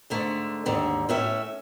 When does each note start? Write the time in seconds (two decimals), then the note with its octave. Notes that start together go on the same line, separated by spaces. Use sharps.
0.10 G#2 D3 A3
0.66 D#2 G#2 D3 E5
1.09 A2 C#4 E5